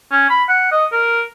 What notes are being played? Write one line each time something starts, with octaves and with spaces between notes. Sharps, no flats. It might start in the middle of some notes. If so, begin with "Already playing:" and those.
C#4
B5
F#5
D#5
A#4